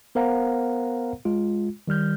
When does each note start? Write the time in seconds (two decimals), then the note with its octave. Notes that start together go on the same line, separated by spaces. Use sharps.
0.15 B3 A#4 C5 F5 F#5 A#5
1.25 G#3 F4
1.88 D#3 G3 F6 G6